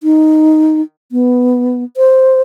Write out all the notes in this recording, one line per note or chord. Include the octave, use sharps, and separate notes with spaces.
D#4
B3
C5